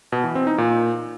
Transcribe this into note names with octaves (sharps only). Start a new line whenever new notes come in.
B2
E3
C4
D#4
A#2